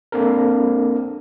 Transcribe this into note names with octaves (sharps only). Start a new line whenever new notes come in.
A#3 C4 D4 A4 A#4